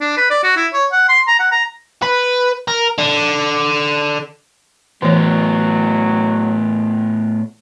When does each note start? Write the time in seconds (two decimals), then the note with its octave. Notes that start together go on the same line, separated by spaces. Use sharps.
0.01 D4
0.17 B4
0.30 D5
0.43 F#4
0.56 E4
0.73 C#5
0.92 F#5
1.08 C6
1.28 A#5
1.39 F#5
1.51 A#5
2.03 B4
2.68 A#4
2.98 D3
5.02 A2 E3 F#3 B3 C#5